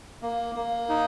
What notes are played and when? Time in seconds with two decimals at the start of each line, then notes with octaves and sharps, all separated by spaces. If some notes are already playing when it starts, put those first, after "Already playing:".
0.22 A#3
0.55 A#3
0.89 D#4